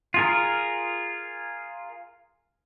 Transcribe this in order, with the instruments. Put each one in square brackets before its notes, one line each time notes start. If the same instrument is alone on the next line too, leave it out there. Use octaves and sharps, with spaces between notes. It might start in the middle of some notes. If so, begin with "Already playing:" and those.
[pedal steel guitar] F4 G#4 A#4